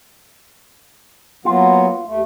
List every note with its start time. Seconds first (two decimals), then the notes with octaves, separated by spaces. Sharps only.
1.45 F#3 A#3 B3 F4
2.05 D#2 A3